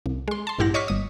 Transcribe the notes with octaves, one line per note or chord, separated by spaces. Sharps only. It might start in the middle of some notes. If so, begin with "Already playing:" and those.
C2
G#3 C6
A5 C6
A#1 G2 E4 G4 F#5 A#6
C#5 D#5 C#6 D6 F6 B6
G1 D#6